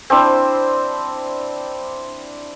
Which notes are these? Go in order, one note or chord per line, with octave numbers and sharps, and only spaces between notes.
C4 D4 E4 C5